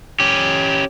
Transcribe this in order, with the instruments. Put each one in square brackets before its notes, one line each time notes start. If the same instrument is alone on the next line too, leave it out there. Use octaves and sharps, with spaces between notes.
[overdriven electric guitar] C#4 G4